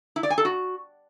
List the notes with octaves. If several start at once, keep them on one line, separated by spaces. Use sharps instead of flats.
E4
D5
G#5
A4
F#4